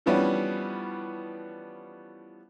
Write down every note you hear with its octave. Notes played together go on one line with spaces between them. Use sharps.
E3 F3 G3 B3 C#4 D4